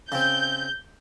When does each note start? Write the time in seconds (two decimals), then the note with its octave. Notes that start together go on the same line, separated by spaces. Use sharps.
0.12 C#3 C4 G6